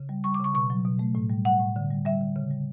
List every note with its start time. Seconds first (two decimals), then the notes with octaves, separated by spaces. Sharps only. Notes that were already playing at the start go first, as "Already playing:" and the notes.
Already playing: C#3
0.09 G3
0.24 G3 C#6
0.34 D6
0.39 C#3 C#6
0.54 B2 C#6
0.70 F#3
0.85 B2
0.99 A3
1.15 A2
1.30 G3
1.45 G3 F#5
1.60 A2
1.76 D3
1.90 G3
2.05 G3 E5
2.21 D3
2.36 C#3
2.51 G3